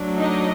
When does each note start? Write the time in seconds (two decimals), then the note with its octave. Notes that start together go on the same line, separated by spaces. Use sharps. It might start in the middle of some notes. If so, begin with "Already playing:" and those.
Already playing: F#3 A3 D4
0.18 D#4 D#5